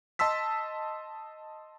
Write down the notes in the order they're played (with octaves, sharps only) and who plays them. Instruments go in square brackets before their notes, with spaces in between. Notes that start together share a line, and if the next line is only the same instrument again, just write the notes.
[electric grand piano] D#5 A5 C6 E6 B6